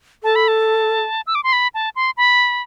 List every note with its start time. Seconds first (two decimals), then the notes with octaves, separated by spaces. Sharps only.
0.23 A4 A5
0.36 B5
0.48 A5
1.27 E6
1.35 D6
1.43 C6
1.53 B5
1.74 A5
1.96 C6
2.17 B5